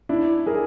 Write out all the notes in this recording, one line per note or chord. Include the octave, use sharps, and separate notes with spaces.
D4 E4
G#4 A#4